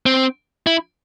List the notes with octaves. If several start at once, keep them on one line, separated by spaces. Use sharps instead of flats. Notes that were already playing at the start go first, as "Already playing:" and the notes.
C4
E4